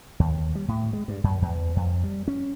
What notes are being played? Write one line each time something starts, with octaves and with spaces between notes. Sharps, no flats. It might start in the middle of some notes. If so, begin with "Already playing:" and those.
D#2
G3
A2
G#3
G2
F#2
E2
F2
G3
C#4